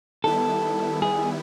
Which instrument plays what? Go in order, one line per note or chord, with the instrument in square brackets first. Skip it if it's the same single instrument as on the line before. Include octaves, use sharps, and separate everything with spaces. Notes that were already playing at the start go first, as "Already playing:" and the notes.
[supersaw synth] D#3 G3 B3 E4 [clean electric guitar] A4
[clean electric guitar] G#4